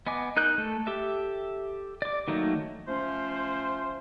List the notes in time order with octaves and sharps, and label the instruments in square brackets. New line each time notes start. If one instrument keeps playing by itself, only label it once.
[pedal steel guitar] B3 D#5 G#5 D6
D#4 A#4 F#6 G6
A3 A4
G4 A4 E5
D5 D6
D#3 F#3 A3 A#3 D#4
[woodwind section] F3 A3 C#4 C5